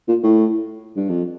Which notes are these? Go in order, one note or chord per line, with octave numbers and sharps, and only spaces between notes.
A#2
A2
G2
F2